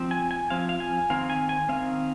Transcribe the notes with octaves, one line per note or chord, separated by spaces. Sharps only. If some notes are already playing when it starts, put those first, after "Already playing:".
Already playing: F3 C4
G#5
G#5
F3 C4 F5
F5
G#5
D#3 C4 F5
G#5
G#5
D#3 C4 F5